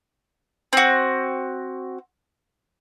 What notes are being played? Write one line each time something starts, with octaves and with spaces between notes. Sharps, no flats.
C4 F#4